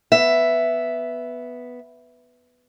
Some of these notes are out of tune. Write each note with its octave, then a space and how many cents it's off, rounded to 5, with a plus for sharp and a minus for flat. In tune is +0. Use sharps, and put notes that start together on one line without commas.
B3 +0 E5 +5